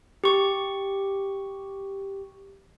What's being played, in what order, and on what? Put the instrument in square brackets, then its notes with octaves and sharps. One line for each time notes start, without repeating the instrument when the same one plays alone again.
[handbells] G4 C#6